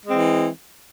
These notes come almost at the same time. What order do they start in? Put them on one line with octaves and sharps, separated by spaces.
G#3 C4 E3